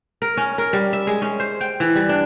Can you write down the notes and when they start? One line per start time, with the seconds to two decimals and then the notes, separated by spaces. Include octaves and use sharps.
0.22 A#4
0.37 C#4
0.58 A#4
0.73 G3
0.93 E5
1.07 G#3
1.22 C#4
1.40 C5
1.61 G5
1.80 E3
1.95 G3
2.09 D4